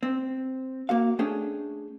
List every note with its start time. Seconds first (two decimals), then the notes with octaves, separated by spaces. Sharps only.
0.03 C4
0.89 A#3 F#4 F5
1.19 A3 C#4 D4 G#4 G5